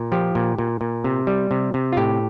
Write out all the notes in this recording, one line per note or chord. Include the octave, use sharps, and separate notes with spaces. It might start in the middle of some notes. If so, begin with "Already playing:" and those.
Already playing: A#2
F3 G4
A#2
A#2
A#2
C3
G3
C3
C3
F4
A2 G4